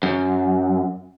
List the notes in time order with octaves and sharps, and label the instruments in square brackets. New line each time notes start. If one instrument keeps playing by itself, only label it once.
[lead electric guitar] F#2